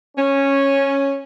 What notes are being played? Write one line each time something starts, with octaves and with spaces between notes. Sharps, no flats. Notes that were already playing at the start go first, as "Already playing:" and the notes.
C#4